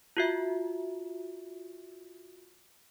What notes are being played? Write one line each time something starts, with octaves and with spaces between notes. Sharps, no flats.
F4 F#4 E5